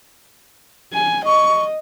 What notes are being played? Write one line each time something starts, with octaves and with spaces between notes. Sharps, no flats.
G#5
D#5 C#6